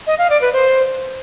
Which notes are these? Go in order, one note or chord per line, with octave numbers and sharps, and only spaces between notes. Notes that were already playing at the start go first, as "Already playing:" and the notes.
D#5
F5
D5
B4
C5